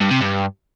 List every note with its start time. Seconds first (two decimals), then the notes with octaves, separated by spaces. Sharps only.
0.01 G2
0.11 C3
0.21 G2